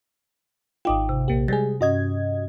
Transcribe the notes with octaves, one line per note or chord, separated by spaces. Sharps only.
G#1 D#4 F4 G5 D6 D#6
C3
A#1 A#3 G4
G3 G#3 G#4 A6
G2 C#4 F#4 D#5 G#6